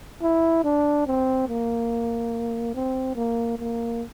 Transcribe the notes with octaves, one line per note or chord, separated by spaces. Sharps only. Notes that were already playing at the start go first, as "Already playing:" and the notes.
E4
D4
C4
A#3
C4
A#3
A#3